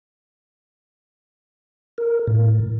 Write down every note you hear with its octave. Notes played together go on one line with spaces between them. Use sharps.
A#4
A2